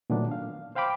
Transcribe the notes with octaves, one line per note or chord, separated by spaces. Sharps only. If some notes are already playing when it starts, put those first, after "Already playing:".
A#2 D#3 F#3 A3 B3 D4
F5
C5 F5 G5 B5 D6